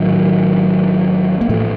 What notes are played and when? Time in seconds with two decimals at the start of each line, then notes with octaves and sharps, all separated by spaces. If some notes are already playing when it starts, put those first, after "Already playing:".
Already playing: A1 A2 D#3 F#3
1.41 A#3
1.49 A2 F3 A3